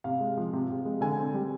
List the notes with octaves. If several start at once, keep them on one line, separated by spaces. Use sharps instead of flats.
C3 F5
G#3
F3
C3
C3
G#3
D3 G#5
C4
G3